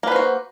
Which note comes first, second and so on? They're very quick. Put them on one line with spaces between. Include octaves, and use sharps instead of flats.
A#3 B4 C5 F#4